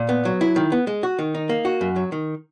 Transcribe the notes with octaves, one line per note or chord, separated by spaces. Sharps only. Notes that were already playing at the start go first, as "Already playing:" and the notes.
Already playing: A#2
B3
F#3
E4
D#3
B3
G#3
F#4
D#3
D#4
A#3
F#4
F#2
F#3
D#3